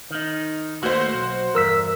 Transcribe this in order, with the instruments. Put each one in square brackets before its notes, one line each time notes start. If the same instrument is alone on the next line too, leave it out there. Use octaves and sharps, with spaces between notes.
[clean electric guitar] D#3 D#4
[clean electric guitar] D#2 A3 A#3 [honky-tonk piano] F#4 C5
[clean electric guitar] B1
[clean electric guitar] E2 G2 [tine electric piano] A#4 E6 B6